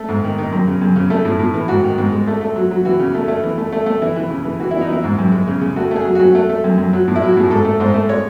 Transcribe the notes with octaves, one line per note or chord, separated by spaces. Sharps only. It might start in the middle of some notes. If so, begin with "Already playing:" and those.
Already playing: A3
G#2
D#3
D#3
F#2
C#3
F#2
C#3
A3
A2
A2
E3
G#2 F#4
D#3
G#2
G#3
A3
A3
F#3
F#3
E3 F#4
C#3
A3
A3
E3
A3
A3
A3
E3 E4
E3
C#3
E3
E3 F#4
E3 E4
D#4
E3 E4
G#2
F#2
G#3
C#3
C#3
A3 F#4
A3 G#4
F#3
F#3 F#4
A3
A3
F#2
F#2
F#3
A2
E4
F#3
F#4
A2 G#4
G#2 A4
A3
G#2 C5
A3
G#3 C#5